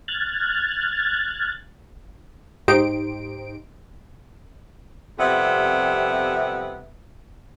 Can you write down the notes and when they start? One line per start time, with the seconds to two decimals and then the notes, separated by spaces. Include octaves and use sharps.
0.08 F6 F#6 G#6 A6
2.68 G#2 D#4 G4 C5 D7
5.18 F2 C3 G3 B3 E5